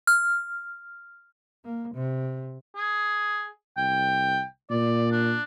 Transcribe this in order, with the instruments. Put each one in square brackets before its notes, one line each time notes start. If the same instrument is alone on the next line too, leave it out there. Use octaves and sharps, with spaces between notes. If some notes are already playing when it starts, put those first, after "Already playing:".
[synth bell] F6
[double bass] A#3
C3
[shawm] G#4
[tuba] C2 [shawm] G5
[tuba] A#2 [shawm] D5
[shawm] D4